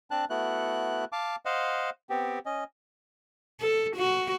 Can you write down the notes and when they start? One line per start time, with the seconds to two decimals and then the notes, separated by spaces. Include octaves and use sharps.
0.11 C4 D4 A5 F#6
0.30 A3 B3 E4 F#4 F#6
1.12 F5 A5 D6
1.45 C5 D#5 F5 F#5
2.10 B3 C4 G4
2.46 C#4 D#5
3.61 A4
3.96 F#4